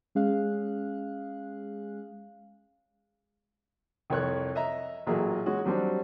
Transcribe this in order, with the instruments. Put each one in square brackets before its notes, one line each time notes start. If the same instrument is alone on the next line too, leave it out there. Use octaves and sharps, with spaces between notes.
[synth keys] G#3 C#4 G#4 F5 F#6
[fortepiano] C2 F2 C#5 F#6
D#5 E5 A#5
A1 A#2 F#3 G#4 E5
G#3 C#4 F#4
F#3 G3 C4 D4